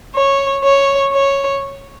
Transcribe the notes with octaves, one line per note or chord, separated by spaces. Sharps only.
C#5
C#5
C#5